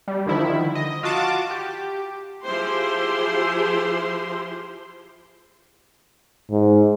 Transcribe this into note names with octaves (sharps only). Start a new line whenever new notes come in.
G3
D3 D#3 F3 E4
D#5
F4 F#4 A5 D6
G4
F3 E4 G4 G#4 C5 C6
G#2